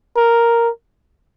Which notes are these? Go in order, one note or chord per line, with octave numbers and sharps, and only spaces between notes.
A#4